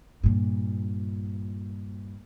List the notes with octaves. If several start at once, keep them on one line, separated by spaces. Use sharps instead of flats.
G2 A#2